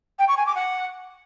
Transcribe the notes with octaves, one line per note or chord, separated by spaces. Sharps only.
G5
C#6
G#5
D6
F#5